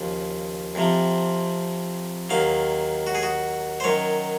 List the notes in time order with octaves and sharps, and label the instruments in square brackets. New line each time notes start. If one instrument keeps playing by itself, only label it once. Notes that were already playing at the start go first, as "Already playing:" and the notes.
Already playing: [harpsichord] D#2 C#3 F3
F2 C3 F3
D#2 D#3 F#3 F5
F#4
G#4
F#4
C5
F#2 D#3 F#3 C#5